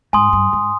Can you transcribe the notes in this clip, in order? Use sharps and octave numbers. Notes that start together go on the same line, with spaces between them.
G#2 G#5 C6 D#6
G2
G#2